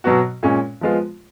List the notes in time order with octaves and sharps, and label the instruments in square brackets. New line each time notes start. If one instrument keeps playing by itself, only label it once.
[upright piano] B2 F#3 B3 F#4
A#2 G#3 C#4
F3 G#3 B3 F4